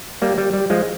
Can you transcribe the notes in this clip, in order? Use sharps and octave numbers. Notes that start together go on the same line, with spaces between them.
G3 A#3
G3
G3
F3 G#3